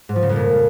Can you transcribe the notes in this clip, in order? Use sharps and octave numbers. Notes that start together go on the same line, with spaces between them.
G#2
F3
C#3
F2
A#2